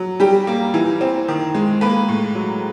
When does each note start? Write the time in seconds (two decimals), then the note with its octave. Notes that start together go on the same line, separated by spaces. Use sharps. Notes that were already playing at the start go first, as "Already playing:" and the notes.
Already playing: F#3
0.20 G3 G4
0.47 A#3
0.74 E3
1.01 C4
1.28 D#3
1.54 G#3
1.81 A#3 B4
2.08 A2
2.35 F#3